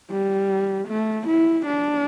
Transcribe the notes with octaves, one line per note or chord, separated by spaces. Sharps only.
G3
A3
E4
D4